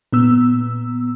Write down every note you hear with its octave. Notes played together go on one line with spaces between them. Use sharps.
A#2 B3 E6